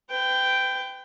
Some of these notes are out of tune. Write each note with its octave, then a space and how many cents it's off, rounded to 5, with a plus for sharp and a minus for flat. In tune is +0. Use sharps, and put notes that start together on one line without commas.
B4 +40 G5 +0